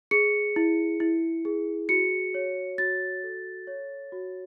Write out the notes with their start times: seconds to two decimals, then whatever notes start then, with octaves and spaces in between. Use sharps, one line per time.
0.11 G#4 C#7
0.56 E4
1.00 E4
1.45 G#4
1.89 F#4 C#7
2.34 C#5
2.78 F#4 A6
3.24 A4
3.67 C#5
4.12 F#4